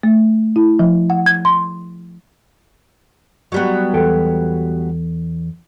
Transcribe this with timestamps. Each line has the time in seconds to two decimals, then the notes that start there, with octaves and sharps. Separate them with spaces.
0.03 A3
0.56 E4
0.79 F3
1.10 F#5
1.26 G#6
1.45 C6
3.52 F#3 G3 B3
3.94 E2 A4 G5